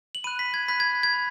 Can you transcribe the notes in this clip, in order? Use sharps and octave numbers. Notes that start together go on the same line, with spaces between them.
F#7
B5 F#6 D#7
B6
G#6
B5 F#6 B6
G#6
G#6
B5